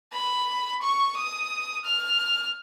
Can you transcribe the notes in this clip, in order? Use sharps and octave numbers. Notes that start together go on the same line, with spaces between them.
B5
C#6
D#6
F6